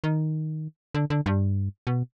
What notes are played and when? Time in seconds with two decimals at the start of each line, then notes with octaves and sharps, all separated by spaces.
0.04 D#3
0.94 D3
1.10 D3
1.26 G2
1.87 B2